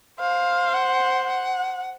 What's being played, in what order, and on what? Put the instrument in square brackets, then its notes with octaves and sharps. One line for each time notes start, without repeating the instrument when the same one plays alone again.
[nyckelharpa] C5 [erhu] F5
[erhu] F#5
F#5